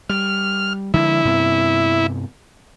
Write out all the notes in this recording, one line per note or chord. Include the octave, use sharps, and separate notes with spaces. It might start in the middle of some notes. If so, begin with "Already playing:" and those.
G3 F6
D3 F3 G#3 E4
G2 C3 B3